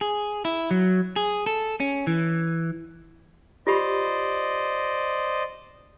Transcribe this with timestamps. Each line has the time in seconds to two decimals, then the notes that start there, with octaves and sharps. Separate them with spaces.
0.01 G#4
0.45 E4
0.71 F#3
1.16 G#4
1.46 A4
1.80 C#4
2.07 E3
3.67 F4 G4 C5 D5 D#5 B5